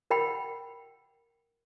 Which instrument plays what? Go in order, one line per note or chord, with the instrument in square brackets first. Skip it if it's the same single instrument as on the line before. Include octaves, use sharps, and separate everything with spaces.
[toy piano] A#4 F#5 G5 B5